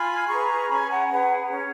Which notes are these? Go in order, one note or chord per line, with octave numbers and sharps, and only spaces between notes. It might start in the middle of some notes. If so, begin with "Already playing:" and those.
Already playing: F4 G#5 B5
G#4 B4 A#5 C#6
C#4 G#5 B5
F#5 A#5
G#5
G#4 B4 F#5 A#5
C#4